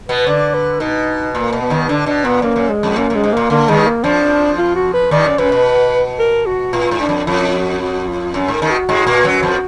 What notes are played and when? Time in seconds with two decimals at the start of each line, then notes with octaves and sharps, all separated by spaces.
0.09 B2 B3 B4
0.27 D3 D5
0.54 B4
0.80 B2 D#4
1.35 A#2 A#3
1.53 B2
1.62 B3
1.70 D#2 D#3
1.89 D3 D4
2.06 B2 D4
2.24 A#2 B3
2.42 F#2 A#3
2.56 F#2
2.69 G#3
2.83 F2
2.96 F#2 A#3
3.10 F#2 G#3
3.24 G#2
3.33 A#2 A#3
3.50 D3 A#3
3.68 D#2 D#3 G#3
3.86 A#3
4.04 F2 F3 D4
4.58 F4
4.76 F#4
4.94 B4
5.11 D#2 D#3 D5
5.25 F#2
5.38 F#2 B4
5.52 B2
6.19 A#4
6.46 F#4
6.73 A#2 F4
6.91 G#2
7.00 D4
7.09 F2
7.27 F2 F4
7.54 F#4
7.81 F#4
8.08 F4
8.34 F#2
8.48 G#2 A#4
8.62 D#2 D#3
8.71 F#4
8.89 G#2 G#3
9.07 A#2 A#3
9.24 F#2 F#3
9.43 F2 F3